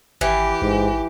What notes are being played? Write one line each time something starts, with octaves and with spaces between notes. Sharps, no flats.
G#1 E3 G4
A1 G#2